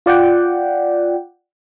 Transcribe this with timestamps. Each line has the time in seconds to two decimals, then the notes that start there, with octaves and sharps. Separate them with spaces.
0.06 F4 D5 F#5 G5